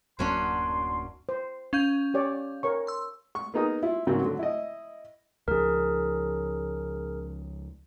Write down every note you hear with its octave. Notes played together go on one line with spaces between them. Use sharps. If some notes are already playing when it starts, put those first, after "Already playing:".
D1 F#2 F#3 A#3 C#4 D4 C6
C5
C#4 F5 G6
G4 C#5 D5
A#4 C#5 C#6
C6 E6
C#6
A#3 B3 D#4 G#4 A#4 D#6
E4 F4
G#2 C#3 F#3 A#3 C4 F#4
D3 F#3
E4 D#5
C#2 F3 G#4 A#4